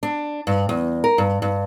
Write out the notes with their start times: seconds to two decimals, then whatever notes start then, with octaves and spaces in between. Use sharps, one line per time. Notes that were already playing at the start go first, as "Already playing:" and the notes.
0.03 D4
0.47 G2
0.69 E2
1.04 A#4
1.18 G2
1.42 G2